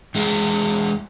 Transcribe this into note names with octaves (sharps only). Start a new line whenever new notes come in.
E2 G#3 G#4 F5